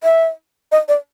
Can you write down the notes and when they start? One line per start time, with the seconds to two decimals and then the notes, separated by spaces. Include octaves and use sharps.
0.04 E5
0.72 D#5
0.88 D5